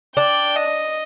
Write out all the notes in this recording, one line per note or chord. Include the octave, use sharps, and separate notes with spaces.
D4 G5
D#5